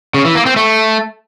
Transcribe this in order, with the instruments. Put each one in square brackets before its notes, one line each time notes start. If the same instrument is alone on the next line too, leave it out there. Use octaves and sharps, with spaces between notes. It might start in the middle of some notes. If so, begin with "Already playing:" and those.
[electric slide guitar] C#3
E3
A#3
C4
A3